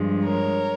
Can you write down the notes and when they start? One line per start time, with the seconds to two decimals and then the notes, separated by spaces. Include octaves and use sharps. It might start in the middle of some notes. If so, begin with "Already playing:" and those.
Already playing: G2 F3 G#3
0.25 A#4 C#5